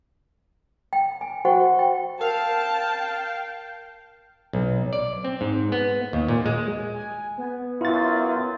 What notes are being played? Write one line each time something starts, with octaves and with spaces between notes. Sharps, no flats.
G5
G#5
F#4 C5 F#5 G5 C#6
G5
A#4 F5 G5 A5
B1
D5
C4
G#2
B3
D#2
A#2
G#3
G#5
B3
F#2 E4 F4 A6